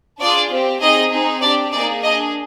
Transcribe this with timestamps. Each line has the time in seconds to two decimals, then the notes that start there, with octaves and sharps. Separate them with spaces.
0.20 D4 F4 G#4 D5
0.51 C4 G4
0.81 C4 D#4 G#4 D#5
1.12 C4 D#4 G#4
1.42 D4 G4 D5
1.73 A#3 D#4 G#4 D5
2.03 D4 G#4 D#5